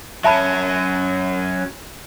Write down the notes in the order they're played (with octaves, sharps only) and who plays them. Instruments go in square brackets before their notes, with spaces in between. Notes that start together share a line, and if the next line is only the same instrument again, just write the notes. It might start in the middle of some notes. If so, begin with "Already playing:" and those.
[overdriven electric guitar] F#3 C#4 [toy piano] E5 A5 B5